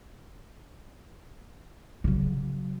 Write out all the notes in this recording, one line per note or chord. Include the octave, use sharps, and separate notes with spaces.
C#3 F#3